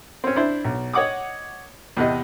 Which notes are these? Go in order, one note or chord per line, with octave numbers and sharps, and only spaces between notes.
C4 C#4
D4 E4 C5
B1
C#5 D#5 F#5 D6 D#6
E2 C3 D#5